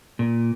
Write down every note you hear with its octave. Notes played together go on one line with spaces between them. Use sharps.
A#2